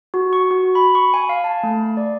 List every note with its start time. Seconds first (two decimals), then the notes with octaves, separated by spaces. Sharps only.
0.14 F#4
0.33 C#6
0.51 F#4
0.75 B5
0.95 C#6
1.14 G#5
1.29 F5
1.44 A5
1.63 A3
1.97 D5